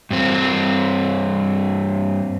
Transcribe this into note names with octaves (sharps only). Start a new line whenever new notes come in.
G2 C4